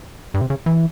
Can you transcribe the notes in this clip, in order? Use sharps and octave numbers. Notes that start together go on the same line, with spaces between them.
G2
C3
C#3
E3